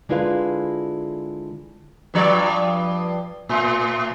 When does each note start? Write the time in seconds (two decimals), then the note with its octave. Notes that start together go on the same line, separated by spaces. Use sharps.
0.09 D3 G#3 E4 F4 B4 F5
2.14 G2 F3 D5
3.49 A2